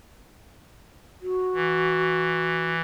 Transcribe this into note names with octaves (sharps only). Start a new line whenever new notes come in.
F#4
E3